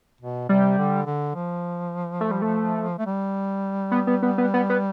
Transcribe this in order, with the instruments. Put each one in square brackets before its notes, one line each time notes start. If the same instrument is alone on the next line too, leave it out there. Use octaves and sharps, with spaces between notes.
[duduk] B2
[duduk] C3 [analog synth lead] G3
[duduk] D3
D3
F3
[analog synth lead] A3
G3
A3
[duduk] A3
G3
[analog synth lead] B3
B3
B3
B3
B3
B3